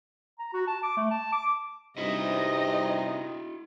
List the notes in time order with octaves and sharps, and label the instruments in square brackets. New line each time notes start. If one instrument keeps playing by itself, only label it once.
[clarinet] A#5
F#4
A5
D6
A3
A5
D6
[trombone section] G2 C3 [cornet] D#4 [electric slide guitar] E4 F#4 [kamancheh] D#5